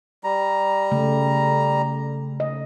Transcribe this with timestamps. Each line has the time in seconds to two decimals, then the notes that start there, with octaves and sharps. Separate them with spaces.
0.24 G3 A#5
0.91 C#3 A3
2.40 D#5